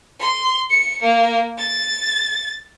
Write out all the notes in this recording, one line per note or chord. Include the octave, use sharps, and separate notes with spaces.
C6
C#7
A#3
A6